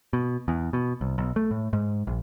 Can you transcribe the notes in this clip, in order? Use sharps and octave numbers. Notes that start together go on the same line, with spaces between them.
B2
E2
B2
C2
B1
A3
A2
G#2
A#1